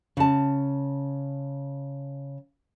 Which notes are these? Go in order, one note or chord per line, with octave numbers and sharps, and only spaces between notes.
C#3 A5